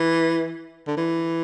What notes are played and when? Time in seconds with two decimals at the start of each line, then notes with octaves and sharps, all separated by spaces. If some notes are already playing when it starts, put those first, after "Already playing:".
Already playing: E3
0.87 D3
0.97 E3